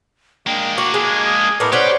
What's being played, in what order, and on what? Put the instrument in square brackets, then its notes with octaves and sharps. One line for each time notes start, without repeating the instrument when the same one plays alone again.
[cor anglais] G#3 [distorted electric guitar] A#3 D4 [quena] G5
[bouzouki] F#4 [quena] D6
[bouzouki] G#3 [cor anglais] G#5
[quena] D#6
[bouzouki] A2 B3 D#4 [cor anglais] A#4 [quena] D6
[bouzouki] C#4 C5 D5 [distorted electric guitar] G4 [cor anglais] B4 [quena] F#5